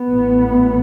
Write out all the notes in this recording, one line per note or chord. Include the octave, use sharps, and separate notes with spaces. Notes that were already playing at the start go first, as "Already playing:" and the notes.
Already playing: B3
A1 A2